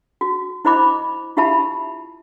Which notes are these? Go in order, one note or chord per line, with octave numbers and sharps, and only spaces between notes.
F#4
E4 C5 D#5 B5 D6
E4 F4 G4 E5 A5 B5